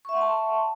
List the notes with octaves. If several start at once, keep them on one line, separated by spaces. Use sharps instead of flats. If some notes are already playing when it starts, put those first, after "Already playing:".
E5 F#5 A5 C6 C#6